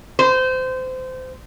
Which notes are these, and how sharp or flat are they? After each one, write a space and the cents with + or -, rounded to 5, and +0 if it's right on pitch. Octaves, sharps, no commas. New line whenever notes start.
C5 -25